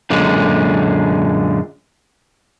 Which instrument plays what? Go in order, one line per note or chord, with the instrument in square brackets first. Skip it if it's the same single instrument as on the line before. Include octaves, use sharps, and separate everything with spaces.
[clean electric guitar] F#2 A#2 D3 G#3